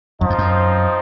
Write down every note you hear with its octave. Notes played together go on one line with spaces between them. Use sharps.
F#2 F3 C4 D#4
F2
F#2